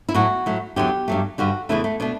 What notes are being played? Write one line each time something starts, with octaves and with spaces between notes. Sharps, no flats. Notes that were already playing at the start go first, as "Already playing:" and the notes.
E4
A2 F#3 A3 F#4
A2 F#3 A3
E2 D3 F#3 G4
G2 F#3 A3
G2 D3 G3 F#4
E2 C#3 E3 A3 E4
A3
B2 A3 D4